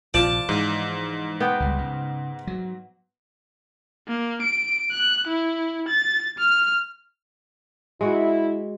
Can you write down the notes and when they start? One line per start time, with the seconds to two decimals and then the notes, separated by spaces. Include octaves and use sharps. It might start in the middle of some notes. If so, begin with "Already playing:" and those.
0.14 A#1 C3 F3 D5 A5
0.49 G#2 E3
1.40 B3 G5
1.60 C#2 G3
1.78 C#3
2.47 F#3
4.08 A#3
4.42 D7
4.91 F#6
5.28 E4
5.88 A6
6.38 F6
8.01 G#3 E4 F#4